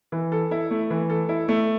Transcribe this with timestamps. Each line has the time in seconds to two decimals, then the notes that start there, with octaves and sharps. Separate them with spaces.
0.12 E3
0.32 A4
0.51 E4
0.71 A3
0.90 E3
1.10 A4
1.29 E4
1.48 A3